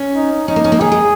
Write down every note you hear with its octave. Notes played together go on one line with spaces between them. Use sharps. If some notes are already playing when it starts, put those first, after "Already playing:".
Already playing: C#4
D#4
C#4 D#4
A#3
C#4
A#3
D#3 G#4
G#3